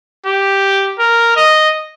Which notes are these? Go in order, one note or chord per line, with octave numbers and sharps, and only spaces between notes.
G4
A#4
D#5